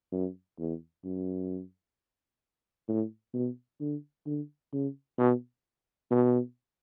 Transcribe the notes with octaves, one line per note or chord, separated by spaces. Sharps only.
F#2
E2
F#2
A2
B2
D3
D3
C#3
B2
B2